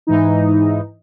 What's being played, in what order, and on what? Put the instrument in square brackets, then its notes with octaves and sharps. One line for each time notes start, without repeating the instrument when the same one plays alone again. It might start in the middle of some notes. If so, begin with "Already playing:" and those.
[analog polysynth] G#2 E3 D#4